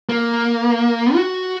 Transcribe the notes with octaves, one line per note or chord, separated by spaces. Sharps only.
A#3
F#4